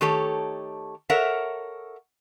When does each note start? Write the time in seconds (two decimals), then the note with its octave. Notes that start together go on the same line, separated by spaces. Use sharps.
0.01 D#3 A3 G4 A4 C#5
1.10 A4 A#4 C#5 E5 F#5